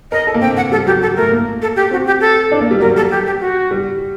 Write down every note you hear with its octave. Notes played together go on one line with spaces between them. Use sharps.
A#4 D#5
A4
A#3
C4 G5
F#5
G3 A4
F#3 G4
A4
A3 A#4
A#3
A4
G4
C4 F#4
G4
A4
D4
A#3
G3
F#3 A#4
G3
A4
G4
G4
F#4
G3